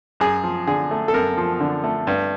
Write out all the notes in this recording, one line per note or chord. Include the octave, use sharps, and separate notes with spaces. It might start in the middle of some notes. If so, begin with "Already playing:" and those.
F#2 G#4
F3
D3 G#4
A3
A4
F#2 A#4
F3
D3
A3
G2